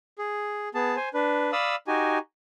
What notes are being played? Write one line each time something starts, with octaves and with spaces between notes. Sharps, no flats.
G#4
B3 G#4 A5
C5 G#5
D4 B4
D5 F5 B5 D#6 E6
D#4 F#4 G4 G#5